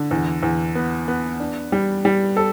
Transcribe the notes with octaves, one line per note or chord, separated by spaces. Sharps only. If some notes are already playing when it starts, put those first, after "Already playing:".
Already playing: D3
E2
E2
B3
B3
D4
G3
G3
A4